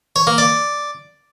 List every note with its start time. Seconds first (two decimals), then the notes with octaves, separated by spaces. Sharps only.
0.16 C#5
0.27 A#3
0.38 D5